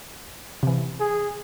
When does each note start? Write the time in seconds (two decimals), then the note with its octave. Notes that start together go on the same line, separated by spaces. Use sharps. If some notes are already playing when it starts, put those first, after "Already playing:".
0.63 C3 E3
1.00 G#4